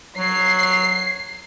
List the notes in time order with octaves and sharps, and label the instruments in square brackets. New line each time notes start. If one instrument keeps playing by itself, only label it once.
[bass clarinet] F#3 [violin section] C7